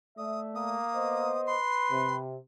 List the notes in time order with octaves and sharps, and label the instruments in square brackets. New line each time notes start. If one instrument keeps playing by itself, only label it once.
[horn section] A3 D5 E5 [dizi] D#6
[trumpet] A#3 [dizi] D#6
[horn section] B3 C5 D#5
[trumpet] B4 [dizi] C6
[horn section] C3